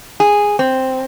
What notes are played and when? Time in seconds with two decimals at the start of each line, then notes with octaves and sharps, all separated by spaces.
0.20 G#4
0.59 C4